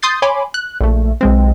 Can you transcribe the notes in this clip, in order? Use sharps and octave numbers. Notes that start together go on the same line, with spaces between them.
C6 D#6 G6 A6 C7
C#5 G#5 B5 C6 D6
F#6
A#1 A3
B1 G#3 C4